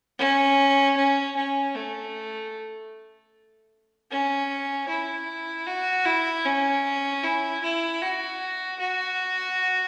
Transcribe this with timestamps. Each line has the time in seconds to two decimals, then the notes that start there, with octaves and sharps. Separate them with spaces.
0.19 C#4
0.97 C#4
1.36 C#4
1.76 A3
4.11 C#4
4.88 E4
5.67 F#4
6.06 E4
6.45 C#4
7.23 E4
7.63 E4
8.01 F#4
8.79 F#4